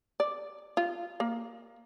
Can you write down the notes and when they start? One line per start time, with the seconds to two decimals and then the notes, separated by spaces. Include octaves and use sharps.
0.20 D5
0.77 F4
1.20 A#3